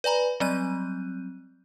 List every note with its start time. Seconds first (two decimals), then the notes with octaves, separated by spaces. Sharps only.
0.04 B4 D5 G#5 A#5 B5
0.40 F#3 G3 C4 F#6 G6 D#7